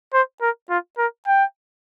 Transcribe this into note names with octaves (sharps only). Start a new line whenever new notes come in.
C5
A#4
F4
A#4
G5